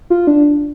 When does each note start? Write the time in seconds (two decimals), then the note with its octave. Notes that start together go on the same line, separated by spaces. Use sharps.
0.10 F4
0.27 D4